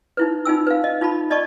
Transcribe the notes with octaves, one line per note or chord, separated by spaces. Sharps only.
D#4 E4 B4
D#4 F4 G#5 E6
B4 F5
D#5
D#4 F4 A5 B5
D5 D#5 A5 B5 C#6